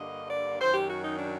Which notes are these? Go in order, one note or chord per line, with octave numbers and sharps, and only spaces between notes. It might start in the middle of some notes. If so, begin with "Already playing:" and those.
Already playing: G2 D3 G3 A#3 D#5
D5
F#2 D#3 F#3 C5
G4
F#4
D#4
D4